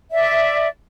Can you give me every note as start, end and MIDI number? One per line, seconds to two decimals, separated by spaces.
0.12 0.67 74
0.12 0.67 76